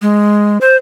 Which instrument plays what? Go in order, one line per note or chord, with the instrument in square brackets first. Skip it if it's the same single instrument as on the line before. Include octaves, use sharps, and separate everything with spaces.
[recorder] G#3
C5